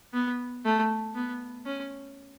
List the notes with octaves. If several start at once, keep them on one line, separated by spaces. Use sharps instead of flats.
B3
A3
B3
C#4